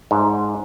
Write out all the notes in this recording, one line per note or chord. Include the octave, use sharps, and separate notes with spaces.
G#2